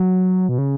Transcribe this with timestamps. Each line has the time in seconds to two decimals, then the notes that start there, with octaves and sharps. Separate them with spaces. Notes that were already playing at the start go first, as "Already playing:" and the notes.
Already playing: F#3
0.49 B2
0.58 C#3